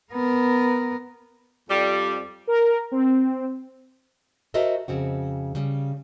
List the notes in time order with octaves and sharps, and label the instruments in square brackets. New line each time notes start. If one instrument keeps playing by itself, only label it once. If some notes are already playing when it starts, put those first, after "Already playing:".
[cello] B3 A#4
[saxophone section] F2 G3
[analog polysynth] A#4
C4
[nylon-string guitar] F#4 A4 A#4 C5 D#5 E5
F2 C#3 C4 F#4
C#3 G3